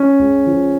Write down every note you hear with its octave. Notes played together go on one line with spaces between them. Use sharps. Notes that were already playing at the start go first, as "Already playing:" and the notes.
Already playing: C#4
C#2
F3